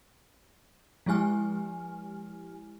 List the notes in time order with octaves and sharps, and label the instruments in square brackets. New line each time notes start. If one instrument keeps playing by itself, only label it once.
[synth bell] F3 G#3 E4 G4 G#5 F6